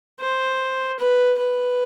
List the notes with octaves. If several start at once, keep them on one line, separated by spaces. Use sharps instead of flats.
C5
B4
B4